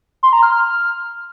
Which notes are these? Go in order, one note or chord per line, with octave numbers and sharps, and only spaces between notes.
C6
A#5
F6